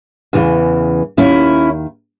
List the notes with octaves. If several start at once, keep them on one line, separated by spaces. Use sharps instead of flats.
E2 C#3 E3
D#2 D#3 C#4 E4